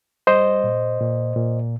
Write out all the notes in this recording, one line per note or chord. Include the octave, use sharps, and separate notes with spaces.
G3 C5 D#5
A#2
A#2
A#2